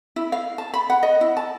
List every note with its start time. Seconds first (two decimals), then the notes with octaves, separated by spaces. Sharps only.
0.16 E4
0.32 F5
0.58 A5
0.74 B5
0.90 F#5
1.03 D#5
1.21 E4
1.37 A5